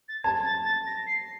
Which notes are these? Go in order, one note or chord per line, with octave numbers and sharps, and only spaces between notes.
A6
A5 G#6
A6
A6
A#6
C7